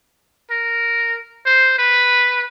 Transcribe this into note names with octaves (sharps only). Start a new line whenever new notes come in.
A#4
C5
B4